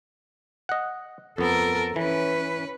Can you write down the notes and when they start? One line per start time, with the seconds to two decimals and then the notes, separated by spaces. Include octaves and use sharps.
0.69 D#5 F#5
1.38 F2 B3 A4 A#4
1.96 E3 C#4 B4